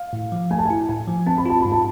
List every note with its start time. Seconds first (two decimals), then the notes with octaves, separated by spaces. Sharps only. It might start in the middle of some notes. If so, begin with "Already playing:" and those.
Already playing: F5
0.13 A2
0.32 F3
0.51 A3 G#5
0.58 A5
0.65 E4 G#5
0.89 A2 G#5
1.08 F3
1.27 C4 A5
1.38 B5
1.46 F4 A5
1.61 G#2 B5
1.72 A5